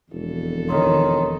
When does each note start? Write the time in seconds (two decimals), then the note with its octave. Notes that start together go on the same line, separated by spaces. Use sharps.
0.13 E1 F2 A4
0.68 D#3 C#5 A#5 C6